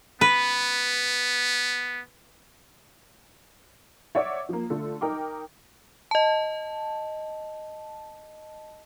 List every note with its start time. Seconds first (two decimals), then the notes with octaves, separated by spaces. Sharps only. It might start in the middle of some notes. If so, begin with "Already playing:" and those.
0.21 B3 B4
4.15 C#5 D5 E5 F#5 D6
4.49 F3 A#3
4.70 D3 A3 F4 A4
5.01 D#4 A#4 G5 D6
6.11 D#5 A5